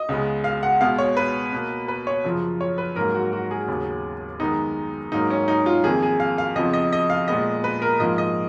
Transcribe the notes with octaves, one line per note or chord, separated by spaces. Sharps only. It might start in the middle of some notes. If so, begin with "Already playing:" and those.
Already playing: D#5
C#2 C#3 G#3 B3
F5
F#5
B2 G#3 B3 F5
C#5
B4
B2 A#3
B4
C#5
F#2 C#3 F3
C#5
B4
G#2 F#3 A#3 A#4
F#4
F#4
G#4
D#2 C#3 F#3 B3
F#2 D#3 G#3 B3 D#4
G#2 F#3 A#3 D#4
C#4
D#4
F4
F2 D#3 A#3 G#4
G#4
F5
F5
F2 C#3 F3 B3 D#5
D#5
D#5
F5
A#2 G#3 B3 D#5
B4
A#4
G#2 F3 A#3 D#5
D#5